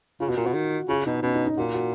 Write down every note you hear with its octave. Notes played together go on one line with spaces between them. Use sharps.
C#3 F4
B2 F#4
A#2 F4
B2 F#4
D#3
C#3 F4
B2 D#4
B2 C#4
D#4
D#4
A#2 F#4
F#4